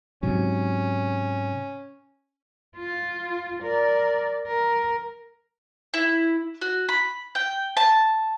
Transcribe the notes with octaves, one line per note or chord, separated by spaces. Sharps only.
G#2 C3 F#3 C#4
F4
A#4 D5
A#4
E4
F#4
B5
G5
A5